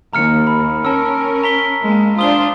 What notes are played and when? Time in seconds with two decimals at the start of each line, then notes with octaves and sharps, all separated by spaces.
0.13 D#2 A#5 F6 C#7
0.47 B5
0.85 C#4 A#4 A5 E6
1.43 A#5 B6 G7
1.83 G#3 A#3
2.19 D4 F4 C5 D#6 G7